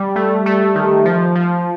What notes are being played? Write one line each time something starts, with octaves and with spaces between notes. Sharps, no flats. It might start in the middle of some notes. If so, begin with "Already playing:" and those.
Already playing: G3
A3
A3
D#3
F3
F3